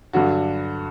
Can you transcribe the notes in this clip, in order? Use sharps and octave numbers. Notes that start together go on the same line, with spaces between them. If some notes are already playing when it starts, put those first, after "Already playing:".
G2 D3 F#3 F#4